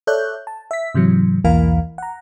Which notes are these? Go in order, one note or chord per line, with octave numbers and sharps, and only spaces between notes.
A4 C#5 D5 E5 F#6 G6
A5
E5 B6
G#2 C3 E3 F#3
B1 E2 E3 A#3 A#4 F5
F#5 A#5